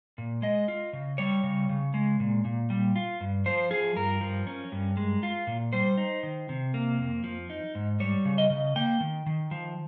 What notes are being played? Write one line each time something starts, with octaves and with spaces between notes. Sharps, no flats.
A#2
G#3 D#5
F4
C#3
G3 C#5
C#3
C#3
G#3
A#2
A#2
G3
F4
G2
F3 C5
F4 G#4
G2 A#4
F3
C#4
G2
G#3
F4
A#2
G3 C5
D#4
D#3
C3
A#3
F2
F3
D#4
G#2
G3 C#5
C#3
D#5
C#3
A#3 G5
D#3
D#3
F3